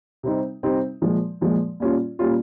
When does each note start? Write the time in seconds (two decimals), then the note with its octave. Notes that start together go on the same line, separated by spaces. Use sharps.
0.23 C3 G3 C4 D#4
0.63 C3 G3 C4 D#4
1.01 A#2 F3 G#3
1.41 A#2 F3 G#3
1.80 A#2 G3 C#4 F4
2.19 A#2 G3 C#4 F4